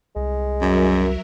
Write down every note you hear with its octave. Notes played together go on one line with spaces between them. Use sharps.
C2 G#3
F#2 F#3 A#4 E5